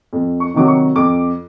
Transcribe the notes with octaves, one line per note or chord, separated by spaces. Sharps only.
F2
C#6
C3 D#3 F#3 D6
C#6
F2 D6